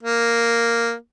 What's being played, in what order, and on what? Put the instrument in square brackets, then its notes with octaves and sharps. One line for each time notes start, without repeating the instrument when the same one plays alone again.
[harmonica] A#3